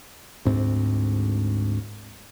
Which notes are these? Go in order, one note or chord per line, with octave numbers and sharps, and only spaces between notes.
D2 G#2 C4